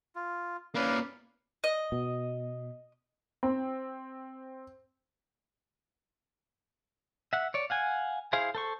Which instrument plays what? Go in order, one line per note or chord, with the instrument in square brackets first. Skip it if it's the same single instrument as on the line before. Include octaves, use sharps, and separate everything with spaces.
[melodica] F4
[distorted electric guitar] A#3 C#4 [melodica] B4 D5 F5
[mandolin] D#5
[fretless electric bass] B2
[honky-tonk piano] C4
[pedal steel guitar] E5 F#5
C#5 D5
F5 F#5 G#5
E4 G#4 C5 F5
A4 C5 C#6